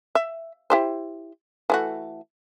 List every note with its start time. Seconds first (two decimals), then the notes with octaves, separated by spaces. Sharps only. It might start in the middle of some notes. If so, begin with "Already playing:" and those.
0.15 E5
0.70 E4 G4 C5
1.70 E3 A3 F#4